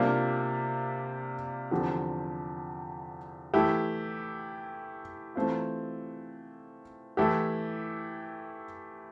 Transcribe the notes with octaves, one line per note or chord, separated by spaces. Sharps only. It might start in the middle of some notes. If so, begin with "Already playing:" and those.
Already playing: C3 G3 A#3 D4 F4
E2 D3 F3 C4 G4
E3 A3 E4 G4
E3 A3 C4 F4
E3 A3 E4 G4